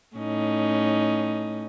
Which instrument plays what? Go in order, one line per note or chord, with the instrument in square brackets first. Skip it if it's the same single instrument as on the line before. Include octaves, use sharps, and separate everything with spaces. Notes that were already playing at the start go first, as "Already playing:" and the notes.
[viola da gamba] A2 C#4 D#4